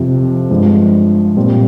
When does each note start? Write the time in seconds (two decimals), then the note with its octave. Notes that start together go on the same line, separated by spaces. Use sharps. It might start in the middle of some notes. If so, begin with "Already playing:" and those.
Already playing: F2 C3 F3
0.50 G2 F3 G#3
1.37 A#2 G3 C4